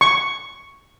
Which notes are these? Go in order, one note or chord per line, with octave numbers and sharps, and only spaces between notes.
C#6